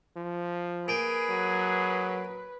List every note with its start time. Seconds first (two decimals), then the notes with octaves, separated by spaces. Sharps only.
0.17 F3
0.88 A#3 G#4 B4 G5 G#5
1.30 F#3